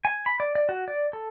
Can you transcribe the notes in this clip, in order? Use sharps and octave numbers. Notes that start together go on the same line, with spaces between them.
G#5
B5
D5
D5
F#4
D5
A4